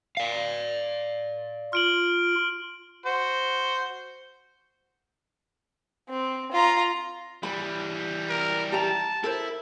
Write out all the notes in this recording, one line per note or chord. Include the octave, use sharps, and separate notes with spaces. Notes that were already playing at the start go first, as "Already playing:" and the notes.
D5 F5
F4 F6 D7 F#7
F#4 C5
C4
F4 A#5
E3 G3 B5
A#4
G4 A5 A#5
E4 A4 A#4 C5